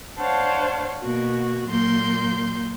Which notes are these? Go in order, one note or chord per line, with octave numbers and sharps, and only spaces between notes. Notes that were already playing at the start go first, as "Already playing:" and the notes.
D4 C5 C#5 F5 F#5 A5
B2 A#3 F#4
A#2 F#3 A#3 C6 G6